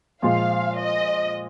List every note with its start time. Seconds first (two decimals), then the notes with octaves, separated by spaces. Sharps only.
0.22 A#2 F3 G#3 F4 F5
0.78 D#5